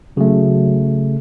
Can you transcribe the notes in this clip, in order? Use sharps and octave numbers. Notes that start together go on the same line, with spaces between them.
C#3 F#3 A3